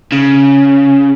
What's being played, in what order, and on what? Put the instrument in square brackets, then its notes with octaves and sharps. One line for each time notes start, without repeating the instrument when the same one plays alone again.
[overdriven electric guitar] C#3